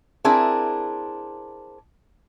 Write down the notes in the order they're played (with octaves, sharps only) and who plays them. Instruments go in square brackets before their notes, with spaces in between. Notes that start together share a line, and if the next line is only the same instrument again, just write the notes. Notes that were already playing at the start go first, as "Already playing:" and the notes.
[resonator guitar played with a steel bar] C4 D4 E4 G#4 A#4